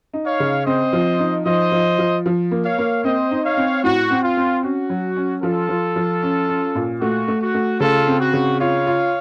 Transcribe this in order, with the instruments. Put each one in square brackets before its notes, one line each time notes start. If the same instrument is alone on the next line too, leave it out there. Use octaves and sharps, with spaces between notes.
[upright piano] D#4
[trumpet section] C#5 F5
[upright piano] C#3
[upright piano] C4 [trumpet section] C5 D#5
[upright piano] F3
D#4
[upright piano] F3 [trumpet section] C5 D#5
[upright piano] F3
F3
F3
A#3
[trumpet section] C#5 F5
[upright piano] A#3
[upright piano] C4 [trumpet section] C5 D#5
[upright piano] D#4
[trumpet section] C#5 F5
[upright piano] C4
[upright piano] A2 [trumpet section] F#4
[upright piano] C4
[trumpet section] F4
[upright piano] C4
[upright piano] C#4 [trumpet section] F#4
[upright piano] F#3
C#4
[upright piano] F3 [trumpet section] F4 A4
[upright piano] F3
F3
C#4
C#4
A#2
[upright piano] A3 [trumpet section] F#4
[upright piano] A3
[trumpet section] F#4
[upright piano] A3
[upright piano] C#3 [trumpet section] F4 A4
[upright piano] C4
[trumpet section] F#4
[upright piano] C#3
[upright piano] F4 [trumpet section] C#5 F5
[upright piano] F4